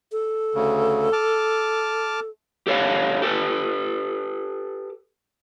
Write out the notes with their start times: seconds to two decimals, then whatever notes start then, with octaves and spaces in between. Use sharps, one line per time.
0.12 A4
0.55 D2 C#3
1.13 A5 D6 F6
2.67 G4 A4 C#5 F5 F#5
3.22 G4 A4 B4